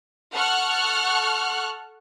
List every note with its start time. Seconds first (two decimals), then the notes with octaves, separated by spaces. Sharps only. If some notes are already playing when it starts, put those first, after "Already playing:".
0.34 A4 F#5 C#6 F6 F#6